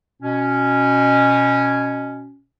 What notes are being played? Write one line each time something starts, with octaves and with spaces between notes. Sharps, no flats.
B2 C#4